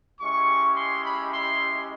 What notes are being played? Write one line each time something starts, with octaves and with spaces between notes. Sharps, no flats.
G#3 C#4 E4 G4 C#6
C6
B5
C6